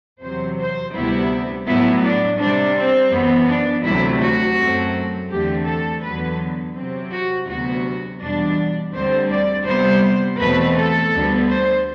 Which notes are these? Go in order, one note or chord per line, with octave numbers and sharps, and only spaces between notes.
E2 C3 F#3 C5
C5
D2 C3 G3 B3 E4
A2 F#3 B3 E4
D4
C3 G3 C4 D4
C4
F#2 E3 B3
D4
D2 C3 F#3 A3 E4
F#4
F#2 F#3 A3 C4
E2 D3 A3 C4 G4
A4
E2 D3 F#3 B3 B4
C3 F#3 C4
F#4
D2 C3 F#3 B3 F#4
E2 B2 G3 D4
D2 D3 G3 C4 C5
D5
C3 G3 B3 C5
E2 B2 A3 C4 B4
A4
D2 D3 G3 B3
C5